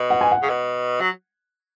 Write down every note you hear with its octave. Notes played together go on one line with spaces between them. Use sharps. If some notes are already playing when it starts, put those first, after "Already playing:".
Already playing: B2
F#5
G#5
F#5
C#3
B2
F#3